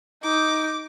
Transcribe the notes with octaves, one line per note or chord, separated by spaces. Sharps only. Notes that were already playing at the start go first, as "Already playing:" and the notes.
D#4 D6